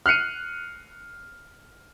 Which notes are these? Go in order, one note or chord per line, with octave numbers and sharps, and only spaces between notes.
F6 F#6 C7 C#7 D#7